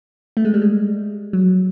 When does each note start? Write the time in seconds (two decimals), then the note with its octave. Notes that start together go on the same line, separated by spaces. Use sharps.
0.37 A3
0.45 G#3
0.54 G3
0.62 G#3
1.33 F#3